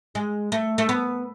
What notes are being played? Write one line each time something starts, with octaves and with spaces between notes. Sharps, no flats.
G#3
A3
A3
B3